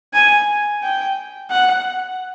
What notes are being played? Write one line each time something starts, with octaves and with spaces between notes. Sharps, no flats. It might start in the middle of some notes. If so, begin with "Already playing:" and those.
G#5
G5
F#5